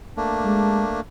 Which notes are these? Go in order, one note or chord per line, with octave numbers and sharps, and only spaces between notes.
A3 A#3 D4
G#3